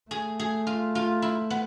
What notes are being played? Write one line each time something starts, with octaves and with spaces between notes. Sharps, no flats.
A3 G#4
G#4
F4
F4
E4
B3